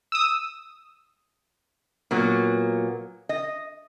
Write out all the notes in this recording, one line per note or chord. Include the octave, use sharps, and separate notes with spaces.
D#6 E6
A#2 F#3 A#3 B3
D#5